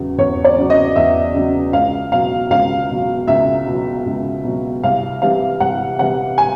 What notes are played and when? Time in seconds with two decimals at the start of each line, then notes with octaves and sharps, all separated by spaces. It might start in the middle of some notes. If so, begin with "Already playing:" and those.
Already playing: E2 C#3 F#3
0.18 E2 C#5
0.44 D5
0.57 C#3 F#3
0.70 D#5
0.96 E2 E5
1.34 C#3 F#3
1.73 C#2 F5
2.11 B2 F#3 F5
2.50 C#2 F5
2.89 B2 F#3
3.28 C#2 E5
3.66 B2
3.71 F#3
4.06 C#2
4.44 B2 F#3
4.83 C2 F5
5.22 C3 E3 G3 F5
5.60 C2 F#5
5.99 C3 E3 G3 F#5
6.38 G#5